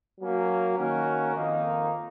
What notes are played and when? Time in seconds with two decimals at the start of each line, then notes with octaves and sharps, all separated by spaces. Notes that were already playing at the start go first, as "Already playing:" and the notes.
0.19 F#3 A#3 C#4
0.77 D#3 A#3 C#4 F#4 A#4
1.34 F2 D#3 A#3 D#4